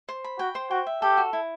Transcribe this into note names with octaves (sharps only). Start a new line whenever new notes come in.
C5
B5
F#4 G5
C5
F#4 G5
E5
G4 A4
F#4
E4